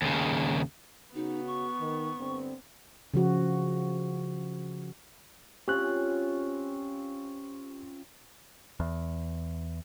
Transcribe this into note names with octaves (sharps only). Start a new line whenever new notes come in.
D#2 C#3
C#3 B3 D#4 F#4
C#6
D#3
G2 D3 C4
C#3 F3 F#4
C4 C#4 F4 G4 F#6
E2